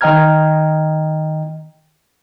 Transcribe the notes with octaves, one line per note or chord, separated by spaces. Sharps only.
D#3 D#5 G5 A#5 F6 G#6